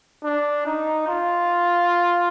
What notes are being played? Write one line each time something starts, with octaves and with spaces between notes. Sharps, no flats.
D4
D#4
F4